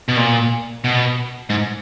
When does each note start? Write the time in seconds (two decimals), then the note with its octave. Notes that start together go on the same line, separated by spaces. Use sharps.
0.08 B2
0.17 A#2
0.84 B2
1.50 G#2